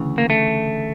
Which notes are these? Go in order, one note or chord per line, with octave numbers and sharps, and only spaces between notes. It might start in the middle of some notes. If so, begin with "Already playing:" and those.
Already playing: D2 C#3 E3
A#3
A3